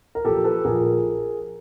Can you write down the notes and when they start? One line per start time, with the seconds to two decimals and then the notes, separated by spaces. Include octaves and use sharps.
0.15 A#4
0.25 A#1 A#2 G4 A4
0.44 A4 B4
0.64 A#1 A#2 G#4 A#4